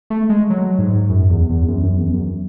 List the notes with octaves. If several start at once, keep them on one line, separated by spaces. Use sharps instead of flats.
A3
G#3
F#3
G#2
F#2
E2
E2
F#2
F#2
E2
F#2